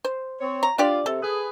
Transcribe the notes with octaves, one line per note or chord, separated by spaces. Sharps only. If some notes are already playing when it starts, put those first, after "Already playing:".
C5
C4 C#5
A#5
D4 F4 G4 D5
C3 A4
G#4 B4